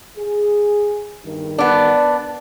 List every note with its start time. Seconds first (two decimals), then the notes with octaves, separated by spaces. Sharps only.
0.18 G#4
1.25 E2 G2 D#3
1.58 B3 D4
1.95 D5